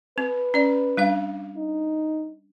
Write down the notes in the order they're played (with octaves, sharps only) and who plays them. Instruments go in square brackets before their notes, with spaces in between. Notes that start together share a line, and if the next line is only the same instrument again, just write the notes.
[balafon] C4 [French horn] B4
[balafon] C#4 D5
G3 D4 F5
[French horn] D#4